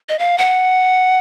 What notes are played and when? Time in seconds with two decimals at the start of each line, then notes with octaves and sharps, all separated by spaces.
0.09 D#5
0.19 F5
0.38 F#5